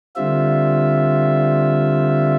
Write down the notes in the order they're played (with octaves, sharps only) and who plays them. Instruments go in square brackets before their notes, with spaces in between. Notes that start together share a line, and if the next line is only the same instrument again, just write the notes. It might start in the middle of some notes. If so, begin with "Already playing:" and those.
[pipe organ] D3 G3 C4 F4 E5